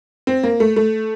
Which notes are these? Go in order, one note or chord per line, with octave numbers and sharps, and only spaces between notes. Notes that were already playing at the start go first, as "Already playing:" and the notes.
C4
A#3
A3
A3